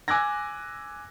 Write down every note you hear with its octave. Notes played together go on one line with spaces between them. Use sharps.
G#5 D6 E6 F#6 G#6 A#6